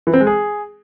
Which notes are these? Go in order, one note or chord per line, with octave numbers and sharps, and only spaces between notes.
E3
C4
G#3
G#4